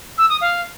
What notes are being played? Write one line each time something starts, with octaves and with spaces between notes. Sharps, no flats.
E6
D#6
F5